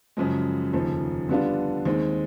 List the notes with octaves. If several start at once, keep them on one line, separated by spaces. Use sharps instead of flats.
F#2 C#3 F3 G#3
F1 D#2 C#3 F3
D3 G3 B3 D4 F4
D#2 D#3 G#3 C4